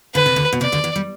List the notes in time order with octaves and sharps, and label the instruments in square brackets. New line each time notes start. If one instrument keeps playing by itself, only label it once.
[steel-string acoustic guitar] D3 [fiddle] B4
[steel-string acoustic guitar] C3
D2 D3
B2
[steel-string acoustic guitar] C3 [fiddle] D5
[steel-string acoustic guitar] D2 D3
E2 E3
G3